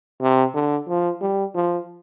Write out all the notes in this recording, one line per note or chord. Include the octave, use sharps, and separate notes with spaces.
C3
D3
F3
G3
F3